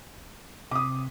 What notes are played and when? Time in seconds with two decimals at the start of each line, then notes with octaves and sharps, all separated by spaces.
0.71 C3 D6 D#6